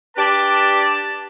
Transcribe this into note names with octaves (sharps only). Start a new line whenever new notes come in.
D4 G4 B4 D5 A5